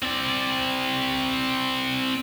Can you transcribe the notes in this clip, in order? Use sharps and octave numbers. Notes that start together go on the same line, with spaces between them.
C4 D5